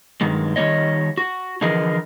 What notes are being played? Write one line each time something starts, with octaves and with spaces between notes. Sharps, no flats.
G2 D#3 F#3 G#3
D#3 G3 A#3 C#4 C#5 D#5
F#4
D3 E3 F3 G#4 A#4 D#5